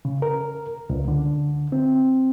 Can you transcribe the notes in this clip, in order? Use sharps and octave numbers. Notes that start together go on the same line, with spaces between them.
C#3
A#4
C#2
D3
C4